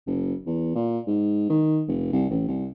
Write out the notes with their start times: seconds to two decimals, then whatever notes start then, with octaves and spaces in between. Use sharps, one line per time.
0.07 F#1
0.46 E2
0.75 A#2
1.07 G#2
1.50 D#3
1.88 F1
2.13 C2
2.30 A1
2.48 C2